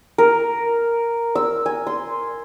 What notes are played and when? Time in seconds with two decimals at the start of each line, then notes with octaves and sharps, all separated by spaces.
0.18 A#4
1.35 E6
1.66 G#5
1.87 C6